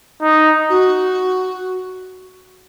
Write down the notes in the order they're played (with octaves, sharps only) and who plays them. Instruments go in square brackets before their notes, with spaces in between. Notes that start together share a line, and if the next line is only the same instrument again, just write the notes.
[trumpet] D#4
[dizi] F#4